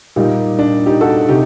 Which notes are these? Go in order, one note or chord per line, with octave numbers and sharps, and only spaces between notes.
A#2 G3 A#3 D#4 G4
D4
D#4 G4
F#4 A4
C3 D#4 G4